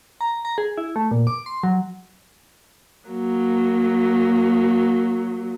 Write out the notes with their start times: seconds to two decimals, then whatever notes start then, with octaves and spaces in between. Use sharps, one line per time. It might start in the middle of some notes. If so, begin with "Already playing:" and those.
0.21 A#5
0.45 A#5
0.58 G#4
0.77 E4
0.96 A3
1.11 A#2
1.27 D6
1.46 C6
1.63 F#3
3.09 F#3 A#3